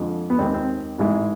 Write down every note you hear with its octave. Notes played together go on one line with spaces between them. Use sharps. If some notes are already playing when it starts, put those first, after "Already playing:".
Already playing: F2 D3 F3 G#3
B3
D#2 D#3 G#3 C4
C4
A1 G#2 E3 G#3